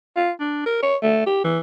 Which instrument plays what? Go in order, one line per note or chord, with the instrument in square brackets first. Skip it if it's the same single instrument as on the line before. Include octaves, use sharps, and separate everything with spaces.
[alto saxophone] F4
D4
A#4
C#5
A3
G4
E3